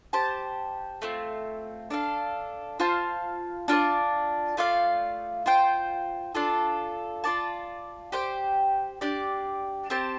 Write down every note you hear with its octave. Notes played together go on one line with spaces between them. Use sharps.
G4 C5 A5
A3 C4 F4
D4 A4 F5
F4 C5 F5 A5
D4 F4 A4 D5
A3 F4 D5 F5
F4 C5 G5
D4 F4 A4
F4 D5 A5
G4 C5 G5
D4 G4 D5
C4 G4 C5 A5